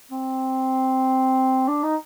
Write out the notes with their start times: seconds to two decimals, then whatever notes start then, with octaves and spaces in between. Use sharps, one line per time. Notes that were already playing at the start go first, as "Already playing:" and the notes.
0.11 C4
1.68 D4
1.83 D#4